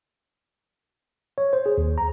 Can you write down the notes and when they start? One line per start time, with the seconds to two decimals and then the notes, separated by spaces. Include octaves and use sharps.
1.38 C#5
1.53 C5
1.66 G#4
1.78 D#2
1.98 A#5